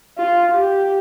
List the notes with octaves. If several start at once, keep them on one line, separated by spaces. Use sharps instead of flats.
F4
G4